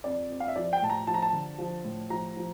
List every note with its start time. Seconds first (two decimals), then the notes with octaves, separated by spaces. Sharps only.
0.04 F2 D5
0.30 F2
0.40 F5
0.48 E5
0.56 F3 D5
0.73 G5
0.82 A2 A5
0.89 A#5
1.07 F3 A5
1.14 A#5
1.22 A5
1.33 D3
1.58 F3
1.84 A2
2.10 F3 A#5
2.37 F3